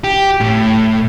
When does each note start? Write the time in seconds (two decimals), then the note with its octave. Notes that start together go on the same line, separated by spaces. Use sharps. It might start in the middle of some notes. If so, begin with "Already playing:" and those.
0.04 G4
0.40 A2